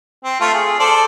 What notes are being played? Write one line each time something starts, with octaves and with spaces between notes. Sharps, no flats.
C4
A3 F4
G#4
A4 C5 D5